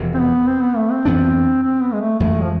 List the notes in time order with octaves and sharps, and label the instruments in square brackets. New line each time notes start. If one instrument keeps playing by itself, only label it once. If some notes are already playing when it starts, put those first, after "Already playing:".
Already playing: [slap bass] E1 E2 C3 F3
[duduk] C4
B3
C4
B3
A3
C4
[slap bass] F2 E3 B3 D4
[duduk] C4
B3
G#3
A3
[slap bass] F2 E3 G#3 [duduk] A3
[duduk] F3